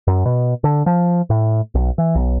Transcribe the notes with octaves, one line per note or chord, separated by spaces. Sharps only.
F#2
B2
D3
F3
A2
B1
E3
B1